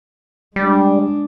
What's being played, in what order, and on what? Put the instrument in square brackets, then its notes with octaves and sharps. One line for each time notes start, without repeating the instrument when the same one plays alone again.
[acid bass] G3 [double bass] G#3 D4